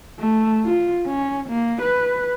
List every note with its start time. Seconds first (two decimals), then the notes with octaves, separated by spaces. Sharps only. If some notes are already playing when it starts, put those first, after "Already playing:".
0.20 A3
0.65 F4
1.06 C#4
1.49 A#3
1.82 B4